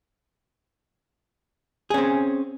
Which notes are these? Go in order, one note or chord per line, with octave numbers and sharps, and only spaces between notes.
C4 C#4 G#4